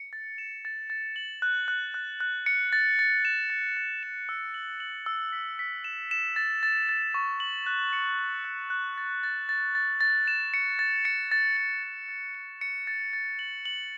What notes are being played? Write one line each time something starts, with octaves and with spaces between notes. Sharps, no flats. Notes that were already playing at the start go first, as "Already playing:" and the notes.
Already playing: C#7
A6
E7
A6
A6
F#7
F#6
F#6
F#6
F#6
C#7
A6
A6
E7
A6
A6
E7
E6
F#7
F#7
E6
B6
B6
E7
E7
A6
A6
A6
C#6
F#7
F#6
C#7
F#7
F#6
F#6
A6
A6
A6
A6
A6
E7
C#7
A6
C#7
A6
A6
A6
A6
C#7
C#7
A6
A6
F#7
F#7